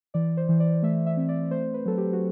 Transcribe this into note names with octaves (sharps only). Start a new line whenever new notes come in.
E3 D5
C5
E3
D5
A3 E5
E5
C4
D5
A3 C5
B4
F#3 A4
G4
F#4